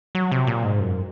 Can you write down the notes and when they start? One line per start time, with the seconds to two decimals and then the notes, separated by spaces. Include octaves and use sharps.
0.15 F#3
0.32 C3
0.47 A#2
0.64 G#2
0.80 F#2